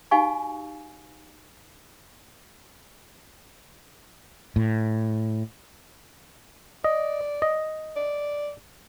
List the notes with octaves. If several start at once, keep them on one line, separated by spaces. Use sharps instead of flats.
D#4 F#4 G4 F5 G#5 C#6
A2
D5 D#5
D#5
D5